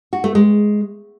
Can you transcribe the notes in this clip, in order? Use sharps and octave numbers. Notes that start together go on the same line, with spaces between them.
F#4
A3
G#3